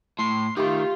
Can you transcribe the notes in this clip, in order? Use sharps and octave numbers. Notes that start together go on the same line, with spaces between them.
A2 C6
D#3 A3 F4 G4 C#6